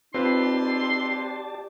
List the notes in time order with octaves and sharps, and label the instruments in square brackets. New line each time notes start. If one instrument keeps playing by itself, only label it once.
[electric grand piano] C4 F4 B4 [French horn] D#4 [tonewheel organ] G4 D5 A5 [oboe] C6